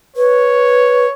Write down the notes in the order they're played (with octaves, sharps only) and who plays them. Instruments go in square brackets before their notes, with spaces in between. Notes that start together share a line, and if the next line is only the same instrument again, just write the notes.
[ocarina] B4 [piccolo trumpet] C#5